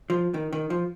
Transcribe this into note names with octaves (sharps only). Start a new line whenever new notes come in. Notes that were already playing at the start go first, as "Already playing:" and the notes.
F3
D#3
D#3
F3